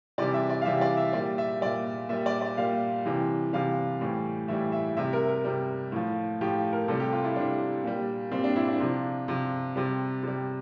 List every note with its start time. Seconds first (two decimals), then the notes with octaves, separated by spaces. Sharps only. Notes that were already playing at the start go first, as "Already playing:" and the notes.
0.18 C3 E3 G3 D5
0.34 E5
0.49 D5
0.61 F5
0.65 C3 E3 G3 E5
0.81 D5
0.97 E5
1.13 A#2 G3 D5
1.38 E5
1.61 A#2 G3 D5
2.09 A#2 G3 E5
2.26 D5
2.41 D5
2.57 A#2 G3 F5
3.05 C3 E3 G3
3.53 C3 E3 G3 F5
4.01 A2 E3 G3
4.48 A2 E3 G3 E5
4.72 E5
4.97 C3 G3 E5
5.13 A#4
5.29 A#4
5.44 C3 G3
5.92 A2 F3
6.41 A2 F3 G4
6.73 A#4
6.88 C3 G3 A4
7.00 G4
7.12 F4
7.24 E4
7.36 C3 G3 D4
7.84 A#2 G3
8.31 A#2 G3 C4
8.44 D4
8.56 E4
8.68 D4
8.80 C3 F3
9.28 C3 F3
9.76 C3 G3
10.23 C3 G3